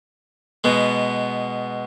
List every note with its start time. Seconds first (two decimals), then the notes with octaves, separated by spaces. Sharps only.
0.64 B2 G#3 B3